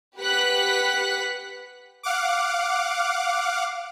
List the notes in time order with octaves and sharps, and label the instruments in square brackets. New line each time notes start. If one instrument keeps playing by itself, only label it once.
[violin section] G4 B4 F#5 F#6 B6
[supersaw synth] F5 F#5 D6